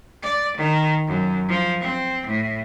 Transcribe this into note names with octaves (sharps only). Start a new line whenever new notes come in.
D5
D#3
F#2
F3
C4
A2